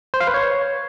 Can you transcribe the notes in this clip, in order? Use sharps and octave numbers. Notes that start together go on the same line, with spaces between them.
C5
F5
B4
C#5